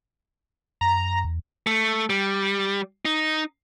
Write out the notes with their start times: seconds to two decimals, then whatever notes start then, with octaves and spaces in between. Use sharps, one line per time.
0.81 F#2 A#5
1.25 E2
1.67 A3
2.10 G3
3.05 D#4